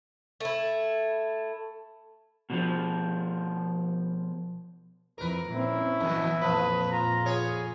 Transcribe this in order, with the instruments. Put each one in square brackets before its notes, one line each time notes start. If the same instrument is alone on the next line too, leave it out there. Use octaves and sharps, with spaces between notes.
[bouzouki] A3 E4
[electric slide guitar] B2 D#3 F3
[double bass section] F2 E3 [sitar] A#4 B4
[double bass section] A#2 C4 [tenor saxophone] C#4 [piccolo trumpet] E4
[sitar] F2 B2 [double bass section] E3 F#3 B3
[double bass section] F2 A#2 [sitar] F3 [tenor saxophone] B4
[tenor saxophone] F4 [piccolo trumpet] A#5
[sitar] B3 C#5 [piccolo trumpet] G#4